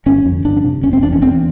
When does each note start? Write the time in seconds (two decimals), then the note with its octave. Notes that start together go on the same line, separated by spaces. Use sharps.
0.06 G1 C#4
0.25 F2
0.45 G1 D4
0.64 C3
0.83 F1 C#4
0.93 C4
1.02 E2 D4
1.12 C#4
1.22 E2 C4